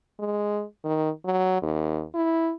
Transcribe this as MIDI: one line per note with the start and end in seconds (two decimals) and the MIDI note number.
0.19 0.63 56
0.84 1.09 51
1.25 1.61 54
1.62 2.03 39
2.15 2.52 64